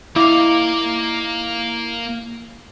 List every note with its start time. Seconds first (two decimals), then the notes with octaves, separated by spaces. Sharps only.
0.16 A#3 D#4 E4 D5 F5